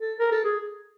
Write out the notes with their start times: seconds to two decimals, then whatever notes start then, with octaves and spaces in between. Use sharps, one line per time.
0.01 A4
0.20 A#4
0.32 A4
0.44 G#4